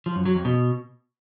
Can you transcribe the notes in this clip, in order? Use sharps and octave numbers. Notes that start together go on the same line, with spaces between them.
F3
F#2
F#3
F2
B2